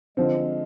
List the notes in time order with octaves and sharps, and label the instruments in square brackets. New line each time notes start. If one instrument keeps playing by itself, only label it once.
[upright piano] D3 F3 C4 [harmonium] G#3